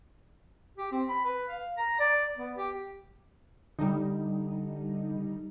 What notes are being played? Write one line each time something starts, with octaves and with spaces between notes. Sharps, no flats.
G4
C4
B5
B4
F5
A#5
D5
B3
G4
D3 G3 D#4